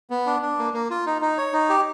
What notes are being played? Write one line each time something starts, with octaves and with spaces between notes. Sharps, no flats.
B3
D4
D4
A#3
A#3
F4
D#4
D#4
C#5
D#4
G4